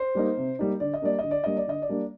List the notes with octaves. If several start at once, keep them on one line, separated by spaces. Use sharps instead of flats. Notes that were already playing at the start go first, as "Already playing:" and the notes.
Already playing: C5
G3 A#3 D#4
C3
G3 A#3 D#4
D3 D5
D#5
G3 A#3 D4 D5
D3 D#5
D5
G3 A#3 D4 D#5
D5
D3 D#5
D5
G3 A#3 D4